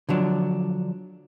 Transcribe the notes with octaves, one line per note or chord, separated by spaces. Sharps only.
D3 F3 F#3 D4